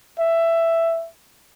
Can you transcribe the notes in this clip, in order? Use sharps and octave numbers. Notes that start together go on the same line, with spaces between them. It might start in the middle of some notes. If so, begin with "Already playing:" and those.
E5